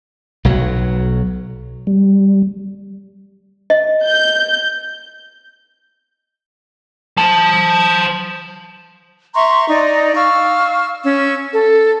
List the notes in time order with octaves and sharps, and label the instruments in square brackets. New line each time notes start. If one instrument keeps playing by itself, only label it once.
[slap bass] B1 F#3
[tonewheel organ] G3
[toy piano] D#5
[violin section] G6
[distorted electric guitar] C5 A5
[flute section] E5 A#5 C6 C#6
D#4 D5 D#5 A#5
F5 C#6 E6 F6
C#4 E6
A4